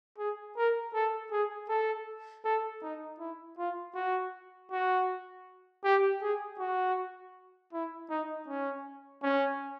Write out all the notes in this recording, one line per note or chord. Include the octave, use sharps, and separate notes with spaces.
G#4
A#4
A4
G#4
A4
A4
D#4
E4
F4
F#4
F#4
G4
G#4
F#4
E4
D#4
C#4
C#4